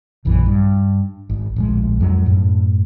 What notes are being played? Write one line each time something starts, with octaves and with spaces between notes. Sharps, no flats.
E1 A#1 F#2 E3
G2
G#1
D1 A#1 G#3
F2 F#3 G#3
F#2 A2